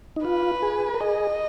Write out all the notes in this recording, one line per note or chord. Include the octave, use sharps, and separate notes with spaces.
D#4
F4 B4
G#4
A#4
G#4 D#5